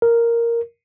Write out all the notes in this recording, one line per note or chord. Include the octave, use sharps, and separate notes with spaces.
A#4